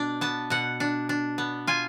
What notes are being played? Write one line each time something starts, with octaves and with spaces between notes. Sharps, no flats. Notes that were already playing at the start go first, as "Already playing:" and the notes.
Already playing: B2 D4 D5
B3 A5
B2 F#5
D4
D4
B3
F4 G#5